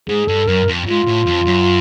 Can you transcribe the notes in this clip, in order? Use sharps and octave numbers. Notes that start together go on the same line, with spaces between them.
G#2 G#4
G2 A4
F#2 A#4
F2
G#2 F4
A2
F2
F#2